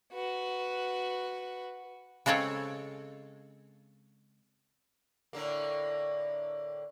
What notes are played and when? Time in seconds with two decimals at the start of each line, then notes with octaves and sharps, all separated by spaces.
0.13 F#4 B4
2.26 C#3 G#3 C4 A4 C#5
5.33 A2 D3 A#3